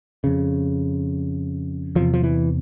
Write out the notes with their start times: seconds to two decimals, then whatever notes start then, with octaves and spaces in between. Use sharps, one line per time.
0.24 F2 C#3
1.95 E2 C3 F3
2.14 F3
2.24 E3